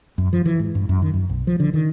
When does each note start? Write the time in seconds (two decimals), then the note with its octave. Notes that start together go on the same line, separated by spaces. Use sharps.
0.18 F#2
0.33 F3
0.45 E3
0.59 G#2
0.75 G2
0.89 F#2
1.02 D#3
1.14 F#2
1.29 B1
1.47 F3
1.60 D3
1.74 D#3